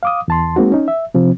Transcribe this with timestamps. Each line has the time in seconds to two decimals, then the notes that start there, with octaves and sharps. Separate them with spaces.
0.03 F5 D6 D#6
0.28 E2 A5 C6
0.56 G#3 A#3 C4 D#4 F#4
0.72 C#4 D#4
0.88 E5
1.14 C3 F3 C4